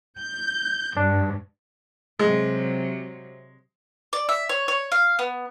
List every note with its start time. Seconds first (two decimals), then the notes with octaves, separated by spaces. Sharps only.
0.19 G6
0.97 G2 D4
2.19 C3 F#3 G#3
4.13 D5
4.29 E5
4.49 C#5
4.68 C#5
4.92 F5
5.19 B3